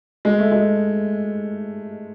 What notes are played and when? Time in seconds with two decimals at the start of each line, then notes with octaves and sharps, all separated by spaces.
0.25 G#3
0.38 A3
0.52 G#3